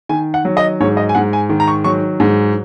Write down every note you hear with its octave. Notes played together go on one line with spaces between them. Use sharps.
D#3 G#5
F#5
F#3
D#5
G#2 C#5
D#5
G#5
G#2 F#5
G#5
D#3
A#5
C#6
F#3 C#6
G#2